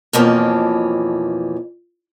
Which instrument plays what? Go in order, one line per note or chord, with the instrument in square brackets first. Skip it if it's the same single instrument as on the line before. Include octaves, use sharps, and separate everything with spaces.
[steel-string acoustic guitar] F2 B2 E3 F3 A#3 C#4